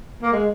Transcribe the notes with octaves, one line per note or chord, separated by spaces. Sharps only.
A#3
G#3